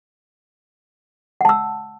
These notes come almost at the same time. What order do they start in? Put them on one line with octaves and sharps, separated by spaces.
F#5 A5 E6